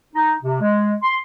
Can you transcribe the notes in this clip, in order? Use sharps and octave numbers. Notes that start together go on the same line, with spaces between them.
D#4
C3
G#3
C6